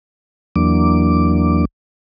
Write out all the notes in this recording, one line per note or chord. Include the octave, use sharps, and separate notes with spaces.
E2 E3 F#3 A#3 D4 D6